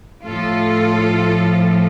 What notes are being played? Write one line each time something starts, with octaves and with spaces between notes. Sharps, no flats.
A2 F3 F4 A4